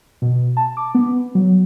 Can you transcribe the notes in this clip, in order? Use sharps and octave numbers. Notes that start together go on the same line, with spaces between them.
B2
A5
D6
B3
F#3